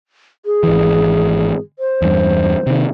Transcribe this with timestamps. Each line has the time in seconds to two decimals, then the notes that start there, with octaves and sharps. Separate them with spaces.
0.46 G#4
0.63 G#1 E3
1.79 C5
2.02 E2 G2
2.67 C3 D#3